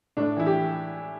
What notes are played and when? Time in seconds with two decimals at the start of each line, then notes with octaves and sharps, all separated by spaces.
0.17 A2 D4
0.37 E3 E4
0.46 G4